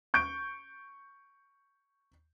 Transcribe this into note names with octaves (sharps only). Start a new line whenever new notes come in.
C#6 G6 D7